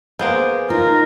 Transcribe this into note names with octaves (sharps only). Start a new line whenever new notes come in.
A#3 B3 G#4 C5
D#4 F4 A#4